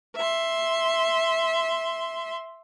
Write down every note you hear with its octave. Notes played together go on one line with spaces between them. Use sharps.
E5 C6